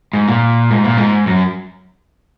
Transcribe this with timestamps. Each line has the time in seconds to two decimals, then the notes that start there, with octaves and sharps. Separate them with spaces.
0.13 G#2
0.28 A#2
0.71 G#2
0.84 A#2
0.98 G#2
1.27 F#2